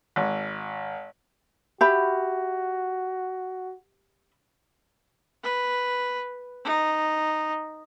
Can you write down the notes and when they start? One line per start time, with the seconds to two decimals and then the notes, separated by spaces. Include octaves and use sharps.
0.16 G#1
1.81 F#4 G4 E5 B5
5.43 B4
6.64 D#4